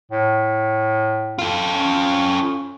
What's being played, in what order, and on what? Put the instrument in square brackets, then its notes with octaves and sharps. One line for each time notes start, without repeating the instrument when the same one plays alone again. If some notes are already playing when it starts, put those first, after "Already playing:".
[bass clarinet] A2
[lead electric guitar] F4 A4
[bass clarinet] C#4